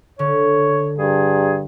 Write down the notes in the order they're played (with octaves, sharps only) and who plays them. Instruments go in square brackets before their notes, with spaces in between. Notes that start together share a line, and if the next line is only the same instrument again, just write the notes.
[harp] D3 [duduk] C#5
[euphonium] G2 [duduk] G#4